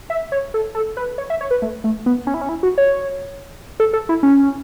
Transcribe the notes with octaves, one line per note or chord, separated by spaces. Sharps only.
E5
C#5
A4
A4
B4
C#5
E5
C#5
B4
A3
A3
B3
C#4
E4
C#4
E4
F#4
C#5
A4
A4
E4
C#4